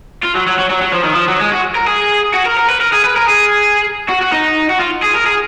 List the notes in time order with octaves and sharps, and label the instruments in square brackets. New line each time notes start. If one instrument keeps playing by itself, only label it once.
[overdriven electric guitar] F4
F#3
F#3
F#3
F#3
F#3
F3
D#3
F3
F#3
G#3
F#4
A#4
G#4
F#4
A#4
A#4
B4
A#4
G#4
B4
A#4
G#4
F#4
F#4
D#4
F#4
F4
G#4
A#4
G#4